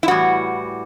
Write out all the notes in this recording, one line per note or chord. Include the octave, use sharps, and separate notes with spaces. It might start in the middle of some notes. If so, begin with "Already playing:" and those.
E4
A2 E3 G3 F#4